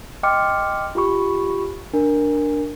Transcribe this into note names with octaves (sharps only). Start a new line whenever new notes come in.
D#5 G5 C6 D6 F6 C#7
F4 G4 B5 C#6
D4 A#4